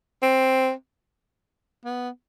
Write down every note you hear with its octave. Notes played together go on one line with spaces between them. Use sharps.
C4
B3